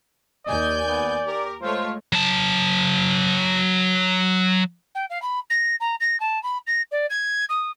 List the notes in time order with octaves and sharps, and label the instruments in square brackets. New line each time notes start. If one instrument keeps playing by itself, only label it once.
[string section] D#2 G#5 G6 [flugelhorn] D5 [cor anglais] D#5
[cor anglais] B3
[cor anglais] G4 [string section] A#4
[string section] G#3 A3 C#5 [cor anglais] F4 [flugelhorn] C5
[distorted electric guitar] F#3 A5
[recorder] G5
F5
B5
A#6
A#5
A#6
A5
B5
A#6
D5
G#6
D#6